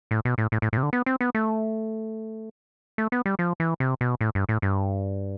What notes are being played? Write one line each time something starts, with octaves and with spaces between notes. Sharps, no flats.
A2
B2
A2
A2
A2
A2
C3
D3
B3
C4
B3
A3
A3
B3
G3
F3
E3
C3
B2
A2
G2
A2
G2